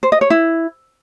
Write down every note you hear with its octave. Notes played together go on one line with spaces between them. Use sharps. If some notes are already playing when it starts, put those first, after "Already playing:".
C5
D#5
C#5
E4